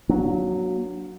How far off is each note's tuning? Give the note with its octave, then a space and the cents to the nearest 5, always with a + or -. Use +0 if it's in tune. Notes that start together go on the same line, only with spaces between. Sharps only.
F#3 +0 A#3 +35 D4 +0